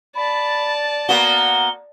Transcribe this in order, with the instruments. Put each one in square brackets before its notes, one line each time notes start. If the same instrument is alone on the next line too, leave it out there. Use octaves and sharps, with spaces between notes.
[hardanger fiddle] D5 A5 [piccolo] B5
[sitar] A#3 B3 F#4 [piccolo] G7